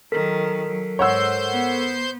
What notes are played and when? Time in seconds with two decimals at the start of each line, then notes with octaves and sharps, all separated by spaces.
0.12 D#3 F#3 A4 A#4 B6
0.67 F#3
0.99 G#2 C5 C#5 F#5 C6 E6 G6
1.51 B3